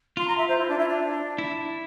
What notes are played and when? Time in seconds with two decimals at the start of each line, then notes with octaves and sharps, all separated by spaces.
0.17 F4 C6
0.27 A#5
0.37 E5
0.48 C5
0.58 E4
0.68 D4
0.78 E4
0.88 D4
1.38 E4